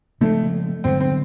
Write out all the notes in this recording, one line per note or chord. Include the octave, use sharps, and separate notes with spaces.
C#3 F3 G#3 A3 C4
G2 D3 F#3 B3 C4
C4